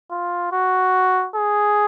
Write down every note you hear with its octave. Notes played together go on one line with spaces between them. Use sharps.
F4
F#4
G#4